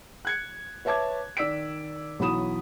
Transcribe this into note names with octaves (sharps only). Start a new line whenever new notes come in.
F#6 G#6 C#7
B4 C#5 E5 A5 D6 G#6
D#3 D5 E6 B6 D7
B1 E3 F#3 B5 D#6 E7